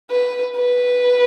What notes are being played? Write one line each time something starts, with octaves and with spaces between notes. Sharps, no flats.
B4
B4